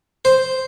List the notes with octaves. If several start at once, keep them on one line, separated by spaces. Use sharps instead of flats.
C5